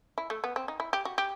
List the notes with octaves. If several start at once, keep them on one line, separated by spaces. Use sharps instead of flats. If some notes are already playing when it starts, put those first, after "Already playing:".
E4
A3
B3
C4
D#4
E4
G4
F#4
G4